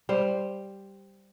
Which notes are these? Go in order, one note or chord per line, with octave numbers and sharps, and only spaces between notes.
G3 C5